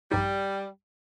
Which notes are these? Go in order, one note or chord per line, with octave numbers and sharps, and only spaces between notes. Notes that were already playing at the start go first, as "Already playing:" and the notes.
A#1 G2 G3 D#4